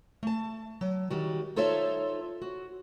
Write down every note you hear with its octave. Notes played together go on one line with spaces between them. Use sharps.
A3 A5
F#3
D#3 G3 F#4
D#4 F4 A4 C5 C#5 E5
F#4